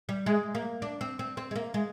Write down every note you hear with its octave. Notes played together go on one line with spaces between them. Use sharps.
G3
G#3
A#3
D4
C4
C4
C4
G#3
A#3
G#3